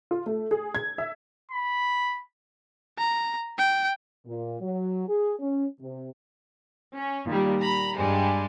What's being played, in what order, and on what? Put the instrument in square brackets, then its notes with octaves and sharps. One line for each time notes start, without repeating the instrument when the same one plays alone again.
[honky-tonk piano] F4
A3
G#4
G#6
E5
[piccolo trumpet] B5
[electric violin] A#5
G5
[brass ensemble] A#2
F#3
G#4
C#4
C3
[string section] C#4
A#2 D#3 G3
A#5 B5
G2 G3 G#3